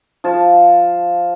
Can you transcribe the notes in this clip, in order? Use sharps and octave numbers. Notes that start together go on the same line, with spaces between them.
F3 F4 A5